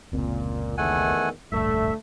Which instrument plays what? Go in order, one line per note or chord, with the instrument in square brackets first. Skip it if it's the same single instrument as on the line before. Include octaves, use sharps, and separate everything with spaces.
[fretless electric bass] F1 C#2 C4 [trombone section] A#2
[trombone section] E2 D#3 [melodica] A3 F#5 G#5
[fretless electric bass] D1 A#1 G2 [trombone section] D3 A3 [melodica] E5